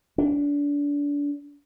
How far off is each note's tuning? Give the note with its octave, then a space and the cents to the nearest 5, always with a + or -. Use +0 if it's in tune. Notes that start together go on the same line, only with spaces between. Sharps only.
D4 -30